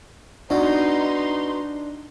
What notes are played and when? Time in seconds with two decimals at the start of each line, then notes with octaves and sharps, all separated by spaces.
0.50 B2 D4 D#4 C6